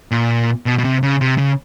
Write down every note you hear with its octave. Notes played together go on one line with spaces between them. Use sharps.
A#2
B2
B2
C3
C#3
C3
C#3